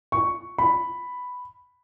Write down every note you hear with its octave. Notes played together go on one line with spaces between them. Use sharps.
C#6
B5